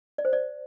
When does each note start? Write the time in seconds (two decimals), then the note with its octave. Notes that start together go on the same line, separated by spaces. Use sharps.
0.18 D5
0.25 C5
0.33 D5